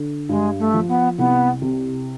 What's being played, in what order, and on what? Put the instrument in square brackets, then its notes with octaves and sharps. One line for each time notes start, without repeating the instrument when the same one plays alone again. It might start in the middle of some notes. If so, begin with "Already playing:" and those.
Already playing: [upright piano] D3
[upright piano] G2 [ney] G#3
[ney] A3
[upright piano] F3
[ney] B3
[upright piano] C2 [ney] B3
[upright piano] C3